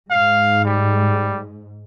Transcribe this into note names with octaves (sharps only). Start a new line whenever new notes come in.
G#2 F5
G3